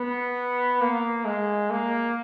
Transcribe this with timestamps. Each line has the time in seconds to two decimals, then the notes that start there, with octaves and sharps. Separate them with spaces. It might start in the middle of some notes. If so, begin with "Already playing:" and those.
Already playing: B3
0.81 A#3
1.25 G#3
1.71 A#3